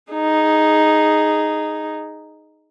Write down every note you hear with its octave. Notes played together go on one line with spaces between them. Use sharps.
D#4 G#4